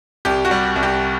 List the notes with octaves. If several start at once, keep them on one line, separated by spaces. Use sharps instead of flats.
C2 G4
F#4
G3
C2
G4